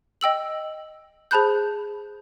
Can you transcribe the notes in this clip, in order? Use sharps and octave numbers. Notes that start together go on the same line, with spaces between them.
D#5 G5 E6 F#7
G#4 C5 A5 B5 F#6 G6